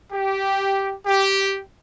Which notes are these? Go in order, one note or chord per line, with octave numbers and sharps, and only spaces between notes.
G4
G4